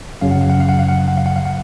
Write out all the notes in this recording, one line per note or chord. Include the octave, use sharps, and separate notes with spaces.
F#2 C#3 F#3 F5
F#5
F5
F#5
F5
F#5
F5
F#5
F5
F#5
F5
F#5
F5
F#5